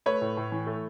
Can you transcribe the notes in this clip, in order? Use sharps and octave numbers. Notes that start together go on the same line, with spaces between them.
A3 B4 C#5
A2
A2
E3
A3